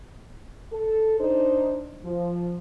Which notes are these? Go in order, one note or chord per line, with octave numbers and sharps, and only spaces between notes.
A4
D4 D#4 C5
F3